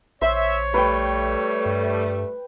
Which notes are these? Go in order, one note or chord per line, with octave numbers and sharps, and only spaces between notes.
A#1 C5 C#5 E5
G3 A3 B4 G5
G2